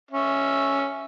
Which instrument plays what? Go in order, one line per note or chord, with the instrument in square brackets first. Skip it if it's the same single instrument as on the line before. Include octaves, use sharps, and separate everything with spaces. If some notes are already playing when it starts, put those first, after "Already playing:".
[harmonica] C#4 E5